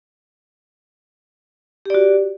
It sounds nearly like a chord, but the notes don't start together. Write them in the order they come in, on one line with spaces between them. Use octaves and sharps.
G4 D5 F#4